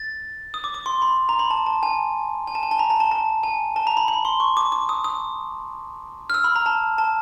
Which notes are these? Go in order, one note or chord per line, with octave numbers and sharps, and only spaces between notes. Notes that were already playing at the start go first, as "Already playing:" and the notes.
Already playing: A6
D#6
D6
D6
C6
B5
A#5
B5
A5
A5
G#5
G#5
A5
G#5
A5
A#5
A5
A5
A5
G#5
A5
A#5
B5
B5
C6
C#6
D6
D6
D#6
D#6
F6
E6
B5
A#5
A5
A5